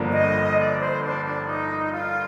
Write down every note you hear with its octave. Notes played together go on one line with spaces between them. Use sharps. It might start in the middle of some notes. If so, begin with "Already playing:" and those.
Already playing: G1 G2 D3 F3 A#3
D#5
D5
C5
D4
D4
D#4
F4